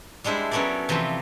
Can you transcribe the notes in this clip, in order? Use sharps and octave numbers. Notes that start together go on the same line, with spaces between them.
G3 G#3 D4 E4 C5
F#3 B3 C#4 A4 A#4 D5
C3 E3 F3 A3 C4